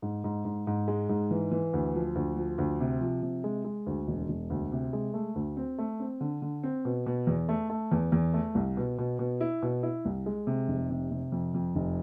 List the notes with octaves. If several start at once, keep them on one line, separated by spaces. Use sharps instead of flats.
G#2
G#2
G#2
G#2
G#3
G#2
E3
E3
D2
F3
D2
F3
D2
C3
F3
C3
G#3
G#3
D2
E1
E1
D2
C3
G#3
A3
D2
C4
A3
C4
D3
D3
C4
B2
B2
E2
A3
A3
E2
E2
A3
C2
B2
B2
B2
E4
B2
E4
C2
G#3
C3
F1
C3
C3
F2
F2
F1